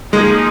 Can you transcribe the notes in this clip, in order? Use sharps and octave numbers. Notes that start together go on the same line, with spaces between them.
F3 G#3 A#3 D#4 G#4